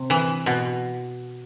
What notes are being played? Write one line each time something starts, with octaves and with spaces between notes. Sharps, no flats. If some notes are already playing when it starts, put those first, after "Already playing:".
Already playing: C3
E3
B2